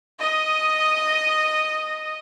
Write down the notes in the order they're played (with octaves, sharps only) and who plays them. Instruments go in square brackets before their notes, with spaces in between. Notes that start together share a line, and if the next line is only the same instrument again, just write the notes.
[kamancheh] D#5 D#6